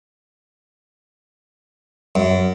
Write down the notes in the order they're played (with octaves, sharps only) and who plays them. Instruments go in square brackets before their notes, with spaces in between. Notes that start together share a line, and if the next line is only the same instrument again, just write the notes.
[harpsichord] F#2